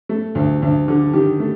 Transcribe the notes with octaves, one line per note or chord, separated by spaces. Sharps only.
A3
D2
D2
D3
D#3 G4
A3